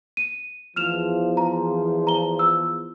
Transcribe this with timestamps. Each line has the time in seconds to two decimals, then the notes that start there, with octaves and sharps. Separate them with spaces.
0.17 D#7
0.76 E2 F3 F6 E7 F7
1.37 A#5
2.07 A#5 G7
2.39 E6